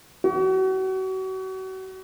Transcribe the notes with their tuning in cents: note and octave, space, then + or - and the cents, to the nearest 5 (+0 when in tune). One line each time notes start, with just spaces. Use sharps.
F#4 +35